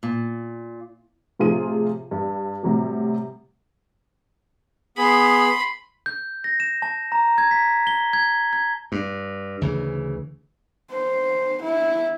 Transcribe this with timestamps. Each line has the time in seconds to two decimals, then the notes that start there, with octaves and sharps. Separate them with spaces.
0.03 A#2
1.39 A2 C3 F3 F4 G#4 D#7
2.11 G2
2.63 A2 C3 F#3 G3
4.98 B3 G#4 B5 C6
6.06 G6
6.44 A#6
6.60 E7
6.82 A5
7.12 A#5
7.38 G#6
7.51 B6
7.87 G7
8.13 G#6
8.53 G#6
8.92 G2
9.61 D2 C#3 E3
10.92 C5
11.62 E4